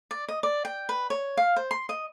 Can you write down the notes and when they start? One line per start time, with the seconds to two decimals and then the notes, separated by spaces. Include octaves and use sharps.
0.11 D5
0.28 D#5
0.43 D5
0.65 G5
0.89 B4
1.10 C#5
1.37 F5
1.56 C5
1.71 C6
1.89 D#5